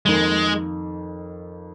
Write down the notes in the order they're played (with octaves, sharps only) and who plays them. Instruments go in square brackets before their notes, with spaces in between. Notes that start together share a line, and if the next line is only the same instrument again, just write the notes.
[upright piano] F2 D#3 A#3 [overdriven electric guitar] G#3